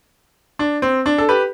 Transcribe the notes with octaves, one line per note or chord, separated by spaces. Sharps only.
D4
C4
D4
A4
G4 B4